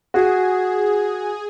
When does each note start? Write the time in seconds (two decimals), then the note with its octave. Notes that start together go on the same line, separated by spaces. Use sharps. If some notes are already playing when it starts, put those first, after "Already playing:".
0.14 F#4 G#4